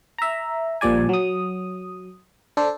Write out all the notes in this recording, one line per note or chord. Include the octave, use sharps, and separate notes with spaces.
E5 A#5
A#1 A#2 F3 G3 D5 G#5
F#3 D#6
D4 A4 C5